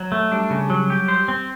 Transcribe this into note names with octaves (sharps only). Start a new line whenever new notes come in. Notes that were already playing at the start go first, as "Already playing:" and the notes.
Already playing: F#3
A3
G3 D4
C#3
F#3
G4
C5
C4